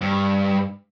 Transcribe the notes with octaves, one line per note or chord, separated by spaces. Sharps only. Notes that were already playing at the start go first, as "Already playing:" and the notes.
G2